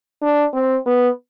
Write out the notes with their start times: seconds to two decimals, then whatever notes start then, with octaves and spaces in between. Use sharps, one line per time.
0.22 D4
0.54 C4
0.86 B3